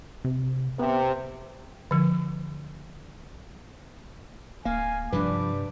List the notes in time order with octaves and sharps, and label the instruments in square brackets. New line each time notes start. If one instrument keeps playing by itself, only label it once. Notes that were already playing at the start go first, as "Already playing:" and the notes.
[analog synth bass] C3
[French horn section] C3 [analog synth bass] B3
[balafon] D3 F3
[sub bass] D1 [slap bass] A#3 [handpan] F5 [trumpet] G#5
[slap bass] G2 C3 G3 [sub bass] F3 [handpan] D4 B4 [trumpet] D6